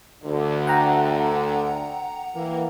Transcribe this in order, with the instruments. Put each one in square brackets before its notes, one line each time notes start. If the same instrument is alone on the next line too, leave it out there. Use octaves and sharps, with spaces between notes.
[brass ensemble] D2 D3
[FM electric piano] F#5 G5 A#5
[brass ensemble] E3 A#3